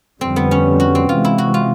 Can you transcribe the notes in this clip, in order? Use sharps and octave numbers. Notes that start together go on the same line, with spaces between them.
F2 D3 G3 C4
B3
C#4
F#4
C4
C3 E3 G#3 F4
E4
F#4
F4